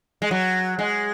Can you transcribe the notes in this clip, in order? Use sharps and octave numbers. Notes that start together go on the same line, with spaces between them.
G#3
F#3
G#3